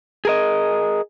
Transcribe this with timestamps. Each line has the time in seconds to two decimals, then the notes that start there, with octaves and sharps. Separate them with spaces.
0.25 G#4 A#4 D#5